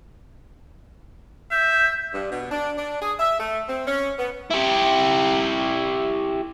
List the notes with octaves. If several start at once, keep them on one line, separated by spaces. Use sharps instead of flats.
E5 G6
G2
B2
D4
D4
G#4
E5
A3
C4
C#4
B3
E4 G4